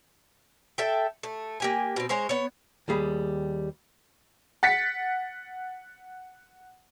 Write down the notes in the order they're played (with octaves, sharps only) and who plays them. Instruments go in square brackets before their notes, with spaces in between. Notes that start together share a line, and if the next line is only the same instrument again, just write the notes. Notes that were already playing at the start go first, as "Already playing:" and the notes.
[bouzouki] A4 E5 G5
A3
A#3 G4 G#5
B2 C4
G#3 C5 C#5 A#5
B3 C#5
[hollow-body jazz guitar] D#2 G3 G#4 B5
[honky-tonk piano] F#5 A6 B6 C#7